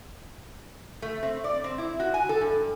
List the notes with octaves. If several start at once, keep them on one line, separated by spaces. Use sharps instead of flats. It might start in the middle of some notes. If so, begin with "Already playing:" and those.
A3
C4
D5
C4
E4
F#4
G#5
A4
G2